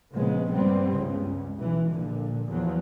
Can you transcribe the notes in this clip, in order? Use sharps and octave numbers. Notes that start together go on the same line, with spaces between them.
A#1 C#3 F3 G#3 B3
G2 G3 B3 C4
C#2 G2 C#3
B1 E3
A#1 A#2 D3
E2 F3 F#3